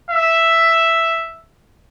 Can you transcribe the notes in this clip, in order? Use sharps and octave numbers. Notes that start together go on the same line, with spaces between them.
E5